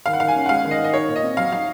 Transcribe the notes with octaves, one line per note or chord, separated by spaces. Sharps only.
D#3 F5
F#5
D#3 F5
G#5
C#4
F#5
G#3 F5
D#3
D#5
D#3
D#5
D#4 C#5
A#2
D#5
C4
F#3 F5
D#4 F5